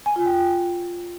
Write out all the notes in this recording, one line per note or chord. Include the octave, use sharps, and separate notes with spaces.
G#5
F4
G5